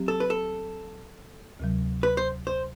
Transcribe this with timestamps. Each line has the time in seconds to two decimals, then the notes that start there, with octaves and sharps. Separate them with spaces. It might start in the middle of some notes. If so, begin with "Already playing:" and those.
Already playing: F#3 C4 G4
0.08 A4
0.20 B4
0.30 A4
1.59 D2 C3 F#3
2.03 B4
2.17 C5
2.47 C5